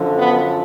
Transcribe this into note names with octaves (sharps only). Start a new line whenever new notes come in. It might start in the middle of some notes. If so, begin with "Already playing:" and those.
Already playing: F#2 D3 F3
B3